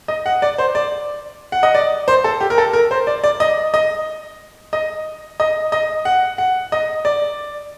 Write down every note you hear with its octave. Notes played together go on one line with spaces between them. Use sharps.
D#5
F#5
D5
C5
D5
F#5
D#5
D5
C5
A4
G4
A#4
A4
A#4
C5
D5
D5
D#5
D#5
D#5
D#5
D#5
F#5
F#5
D#5
D5